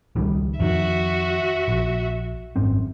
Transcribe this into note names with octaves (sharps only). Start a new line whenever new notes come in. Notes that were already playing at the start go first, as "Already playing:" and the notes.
C#2 D#3 G3
F2 D#3 F#4 E5
A#1
G#1 F#2 C4